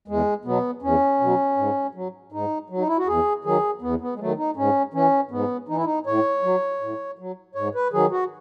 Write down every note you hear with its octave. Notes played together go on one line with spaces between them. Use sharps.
E2 G#3
B2 F#3 B3
E2 C#4
B2 F#3
G#2
F#3
G#2 D#4
F#3
D#4
E4
F#4
E2 G#4
D#3 F#3 G#4
E2 B3
B3
G#3
D#3 F#3 A3
D#4
G#2 C#4
E3 C#4
G#2 B3
E3 D#4
E4
D#4
A2 C#5
F#3
A2
F#3
G#2 C#5
B4
D#3 F#3 G#4
F#4